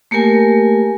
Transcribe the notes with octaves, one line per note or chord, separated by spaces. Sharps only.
A3 A#3 G4 A#4 G#5